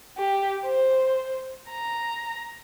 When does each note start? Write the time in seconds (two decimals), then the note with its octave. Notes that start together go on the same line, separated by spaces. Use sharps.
0.17 G4
0.65 C5
1.70 A#5